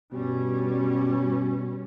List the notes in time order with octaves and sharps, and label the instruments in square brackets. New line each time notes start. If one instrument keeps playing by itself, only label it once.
[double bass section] G2 G3 C#4 [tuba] B2